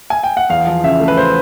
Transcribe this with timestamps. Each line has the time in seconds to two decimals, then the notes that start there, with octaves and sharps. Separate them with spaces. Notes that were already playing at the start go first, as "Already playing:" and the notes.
0.10 G#5
0.24 G5
0.37 F#5
0.49 E2 F5
0.67 F3
0.84 C#3 E5
1.00 A3
1.08 B4
1.17 C5